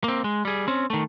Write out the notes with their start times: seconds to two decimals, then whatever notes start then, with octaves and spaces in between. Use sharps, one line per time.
0.04 A#3 C4
0.24 G#3
0.45 G3 G#4
0.68 C4 C#4
0.90 D#3 A3